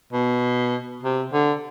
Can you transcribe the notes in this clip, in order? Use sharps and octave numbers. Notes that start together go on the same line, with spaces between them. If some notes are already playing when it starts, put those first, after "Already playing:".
B2
C3
D3